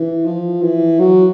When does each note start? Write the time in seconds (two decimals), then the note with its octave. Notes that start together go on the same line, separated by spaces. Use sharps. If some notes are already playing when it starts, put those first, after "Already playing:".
Already playing: E3
0.25 F3
0.62 E3
0.99 F#3